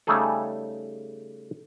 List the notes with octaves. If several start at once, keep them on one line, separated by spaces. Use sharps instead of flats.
C#3 G3 A3 D#4 G#4 A4